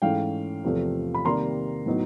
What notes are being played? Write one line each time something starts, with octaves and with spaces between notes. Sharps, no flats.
G#2 E3 A3 C#4 F5 G5
E2 C3 F3 A3
B5
C3 D#3 G3 A#3 A#5 C6
A2 F#3 B3 D#4